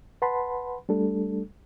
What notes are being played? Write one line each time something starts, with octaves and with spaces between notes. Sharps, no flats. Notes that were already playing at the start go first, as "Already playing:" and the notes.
B4 F#5 A5 B5 C6
G3 A3 D4 A4